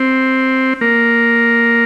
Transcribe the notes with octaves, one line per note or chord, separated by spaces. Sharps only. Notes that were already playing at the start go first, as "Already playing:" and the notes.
Already playing: C4
A#3